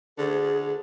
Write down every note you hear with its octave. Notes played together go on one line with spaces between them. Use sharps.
D3 G#4